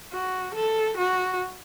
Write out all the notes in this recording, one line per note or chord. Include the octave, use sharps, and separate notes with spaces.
F#4
A4
F#4